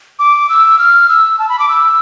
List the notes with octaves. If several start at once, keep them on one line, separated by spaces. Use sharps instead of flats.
D6
E6
F6
E6
A5
B5
D6
E6